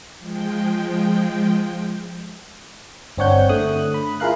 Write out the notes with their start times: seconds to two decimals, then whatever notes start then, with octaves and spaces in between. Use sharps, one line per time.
0.19 F3 G#3 G5
3.17 G1 C4 D4 C#5 F#5 G6
3.49 D3 A3 D#6 F#6
3.94 B5
4.20 E4 F4 G#4 A#4 F5 F#6